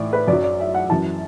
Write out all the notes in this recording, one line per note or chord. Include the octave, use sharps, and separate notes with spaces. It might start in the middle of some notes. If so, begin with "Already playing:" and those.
Already playing: A2 E3 D5
B4
F#2 F#3 D5
D5
E5
F#5
F#2 E3 A5